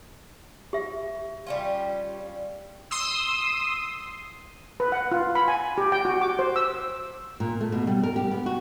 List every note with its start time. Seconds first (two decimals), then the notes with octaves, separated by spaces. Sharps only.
0.73 G4 E5
1.47 G3 C#4 F4
2.91 C6 D#6 E6
4.80 B4
4.92 F#5
5.12 F4
5.35 B5
5.48 G#5
5.78 G4
5.92 G5
6.05 F#4
6.21 D6
6.39 C5
6.56 E6
7.40 A#2
7.61 A3
7.72 B2
7.87 G3
8.03 A#4
8.16 G4
8.31 B3
8.46 F#4